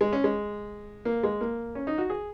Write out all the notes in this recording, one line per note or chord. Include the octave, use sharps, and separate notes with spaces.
G#3
C#4
G#3
A#3
G#3
A#3
C#4
D#4
F#4
G#4